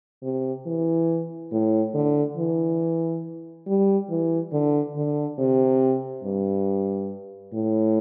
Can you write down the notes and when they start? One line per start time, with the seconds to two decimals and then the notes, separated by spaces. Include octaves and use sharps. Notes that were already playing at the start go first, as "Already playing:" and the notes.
0.23 C3
0.66 E3
1.52 A2
1.95 D3
2.37 E3
3.67 G3
4.10 E3
4.53 D3
4.96 D3
5.39 C3
6.24 G2
7.54 A2